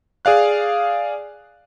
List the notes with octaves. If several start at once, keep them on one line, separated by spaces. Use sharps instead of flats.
G#4 D5 F5 F#6